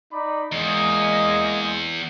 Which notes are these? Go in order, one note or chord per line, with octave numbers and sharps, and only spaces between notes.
D#4 D5 B5
E2 G#3 A#3 D#5